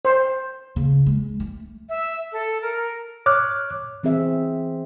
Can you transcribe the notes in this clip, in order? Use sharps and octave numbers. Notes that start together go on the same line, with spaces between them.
C5
C#3
G#3
A3
E5
A4
A#4
C#5 D6 F6 F#6
E3 C4 G#4 E5